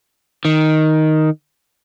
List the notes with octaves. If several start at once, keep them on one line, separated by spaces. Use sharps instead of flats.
D#3